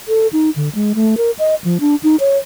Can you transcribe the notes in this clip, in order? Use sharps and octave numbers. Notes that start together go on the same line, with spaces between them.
A4
D#4
D3
G#3
A3
A#4
D#5
F3
D4
D#4
C#5